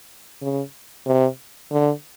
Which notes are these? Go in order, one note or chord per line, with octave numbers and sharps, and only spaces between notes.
C#3
C3
D3